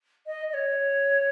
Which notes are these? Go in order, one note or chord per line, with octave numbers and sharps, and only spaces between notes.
D#5
D#5
C#5